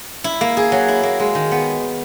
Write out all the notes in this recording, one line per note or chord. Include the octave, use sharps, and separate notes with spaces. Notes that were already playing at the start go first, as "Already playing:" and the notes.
E4
A#3
G#4
F#3
E4
A#3
G#3
D#3
B3